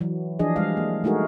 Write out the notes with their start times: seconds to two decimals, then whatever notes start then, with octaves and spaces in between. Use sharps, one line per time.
0.01 E3 F#3
0.39 E3 F3 D4 G#4 D#5
0.56 G3 G#3 F5
0.77 A#3
1.04 G#3 A3 D#4 F#4 G#4 A#4